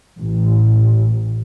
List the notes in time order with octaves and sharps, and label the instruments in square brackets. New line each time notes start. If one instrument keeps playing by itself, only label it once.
[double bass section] A1